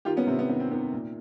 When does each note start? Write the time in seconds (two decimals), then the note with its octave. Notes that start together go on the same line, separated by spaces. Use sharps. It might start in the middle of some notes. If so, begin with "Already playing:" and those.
0.05 D#3 F4 G4
0.17 B3 C#4
0.27 C3 C4
0.39 B3
0.49 D#3 B3
0.60 C4
0.71 D#3 B3
0.93 A#2